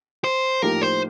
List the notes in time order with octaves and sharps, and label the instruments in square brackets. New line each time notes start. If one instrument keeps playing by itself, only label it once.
[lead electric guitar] C5
[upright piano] A2 F3 A#3 D#4 G4 [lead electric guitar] A#4
[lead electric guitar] C5